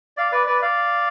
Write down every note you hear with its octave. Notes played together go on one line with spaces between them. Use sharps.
D5 F5
B4 D5
B4 D5
D5 F5